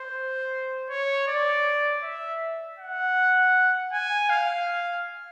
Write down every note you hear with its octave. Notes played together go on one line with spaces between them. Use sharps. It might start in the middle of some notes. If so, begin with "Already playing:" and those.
Already playing: C5
C#5
D5
E5
F#5
G#5
F5